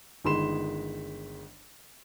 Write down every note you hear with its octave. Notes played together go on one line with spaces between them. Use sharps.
G1 D#3 G#3 B5 C6 E7